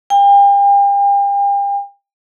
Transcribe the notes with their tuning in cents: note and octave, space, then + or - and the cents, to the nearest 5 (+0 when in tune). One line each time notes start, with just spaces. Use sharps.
G5 +40